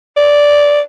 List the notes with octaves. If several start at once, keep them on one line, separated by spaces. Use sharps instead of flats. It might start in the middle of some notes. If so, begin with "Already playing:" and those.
D5